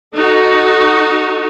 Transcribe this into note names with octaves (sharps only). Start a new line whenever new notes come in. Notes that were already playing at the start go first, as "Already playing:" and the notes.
D#4 F#4 A4